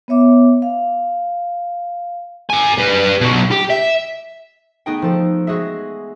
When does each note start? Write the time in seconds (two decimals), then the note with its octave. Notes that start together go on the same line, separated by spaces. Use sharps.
0.08 B3 C#5 E5 D6
0.62 F5
2.50 A#4 G#5
2.78 G3 B4
3.21 B2 F#3
3.51 G4
3.70 E5
4.86 A3 B3 D#4 G#4 G5
5.02 F3 A4
5.47 G#3 F#4 G#4 E5